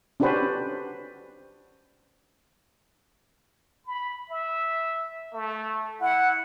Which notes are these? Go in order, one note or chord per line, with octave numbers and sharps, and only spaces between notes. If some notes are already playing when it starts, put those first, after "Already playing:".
C#4 D4 F#4 G4 B4 C5
B5
E5
A3
E4 F#5